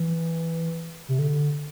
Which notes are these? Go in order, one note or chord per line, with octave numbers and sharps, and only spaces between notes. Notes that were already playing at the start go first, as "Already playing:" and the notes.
Already playing: E3
C3
D3